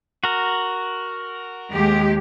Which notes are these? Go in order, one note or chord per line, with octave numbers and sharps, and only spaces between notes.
F#4 A#4
D#2 G#3 G4